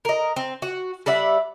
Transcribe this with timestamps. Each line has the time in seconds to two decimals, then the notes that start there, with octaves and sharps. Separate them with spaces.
0.05 A#4 D#5
0.36 C4
0.62 F#4
1.06 G3 D5 E5 F#5